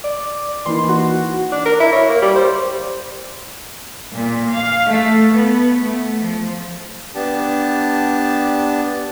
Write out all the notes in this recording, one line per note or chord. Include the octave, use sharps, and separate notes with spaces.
D5
E3 A#3 D#4 C6
F#4
D4
A#4
E4
C#5
A#3
G3
C5
A#2
F5
A3
B3
A3
F3
B3 D4 G4 A5